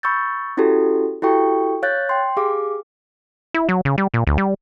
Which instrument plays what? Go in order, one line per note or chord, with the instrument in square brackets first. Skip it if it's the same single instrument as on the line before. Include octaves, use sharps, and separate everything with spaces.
[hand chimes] B5 C#6 E6 G6 A6
C#4 E4 F#4 G4 A4
E4 F#4 G4 A4 G5 C#6
C#5 F5 F#6 G6 A6
G5 C6
G4 G#4 F5 D6
[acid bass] E4
F#3
C#3
G3
A#2
D2
G3